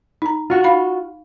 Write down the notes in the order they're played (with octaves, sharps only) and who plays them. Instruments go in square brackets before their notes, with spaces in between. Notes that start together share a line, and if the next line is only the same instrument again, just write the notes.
[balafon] D#4 A#5
[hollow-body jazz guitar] F4 F#4
[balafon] D#4 F5 B5